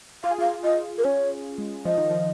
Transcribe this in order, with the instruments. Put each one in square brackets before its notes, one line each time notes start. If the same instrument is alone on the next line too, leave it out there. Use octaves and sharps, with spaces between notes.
[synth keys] F4 [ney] F5
[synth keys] G#4
[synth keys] F4 [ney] F5
[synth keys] F4 [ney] D#5
[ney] A#4
[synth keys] C#4 [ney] C#5
[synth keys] G#3
[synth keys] F3 [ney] D#5
[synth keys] D#3
F3